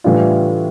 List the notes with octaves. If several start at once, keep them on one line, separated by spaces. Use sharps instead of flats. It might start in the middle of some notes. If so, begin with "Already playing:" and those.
A2 E3 G3 D4 F4